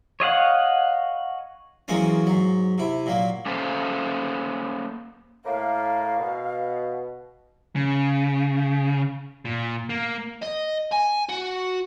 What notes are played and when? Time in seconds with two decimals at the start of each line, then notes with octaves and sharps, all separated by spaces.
0.20 C#5 D#5 F5 F#5
1.88 E2 F#3 G#3 A#3 C4 C#4
2.26 G#2 F#3
2.78 C3 E4
3.06 A#2 F#3 A#3
3.46 A#3 C#4 A4 C5 E5 F5
5.45 A2 A#3 F5
6.18 B2
7.76 C#3
9.45 A#2
9.89 A#3
10.42 D#5
10.92 G#5
11.29 F#4